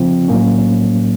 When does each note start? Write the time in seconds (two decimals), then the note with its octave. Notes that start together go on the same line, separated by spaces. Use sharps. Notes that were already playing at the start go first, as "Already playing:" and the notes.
Already playing: C#3 F3 C4 F4
0.28 A2 F#3 A#3 C#4